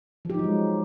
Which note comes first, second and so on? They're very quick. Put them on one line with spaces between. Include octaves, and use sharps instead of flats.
F3 G4 D#4 F#3 G#3